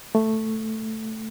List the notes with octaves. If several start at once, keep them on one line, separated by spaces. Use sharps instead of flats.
A3